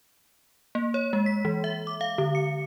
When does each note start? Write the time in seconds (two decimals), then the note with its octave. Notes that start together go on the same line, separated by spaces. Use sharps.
0.75 A#3
0.94 C#5
1.13 G#3
1.26 B6
1.45 E3
1.64 E5
1.87 D6
2.01 F5
2.18 D3
2.35 C#7